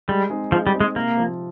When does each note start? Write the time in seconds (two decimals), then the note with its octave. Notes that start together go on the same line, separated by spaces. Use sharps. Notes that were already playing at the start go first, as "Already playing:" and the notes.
0.08 G3 G#3
0.30 C4 D#4 G#4
0.52 F3 G#3
0.67 G3
0.74 C4 D#4 G#4
0.80 G#3
0.96 C3 A#3
1.17 F3 C4